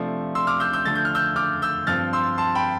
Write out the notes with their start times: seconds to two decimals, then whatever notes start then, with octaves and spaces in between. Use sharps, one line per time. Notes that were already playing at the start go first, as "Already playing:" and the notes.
Already playing: C3 F3 A3 D4
0.35 C6 E6
0.47 D6 F6
0.60 E6 G6
0.73 E6 G6
0.85 D3 F3 A3 A6
0.95 G6
1.05 F6
1.15 E6 G6
1.36 D6 F6
1.62 E6 G6
1.87 G2 F3 C4 F6 A6
2.13 C6 E6
2.38 A5 C6
2.55 G5 B5